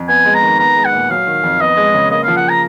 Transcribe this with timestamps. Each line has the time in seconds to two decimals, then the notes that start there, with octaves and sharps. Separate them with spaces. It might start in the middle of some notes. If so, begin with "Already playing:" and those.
Already playing: F2
0.08 B3 G#5
0.25 G#3
0.34 A#5
0.42 D#3
0.59 B3 A#5
0.76 G#3
0.85 F#5
0.93 A#2
1.10 F#3 F5
1.27 D#3
1.44 F2
1.60 B3 D#5
1.77 G#3
1.94 C#3
2.11 A#3 D#5
2.23 F3 F5
2.37 F#5
2.49 A#5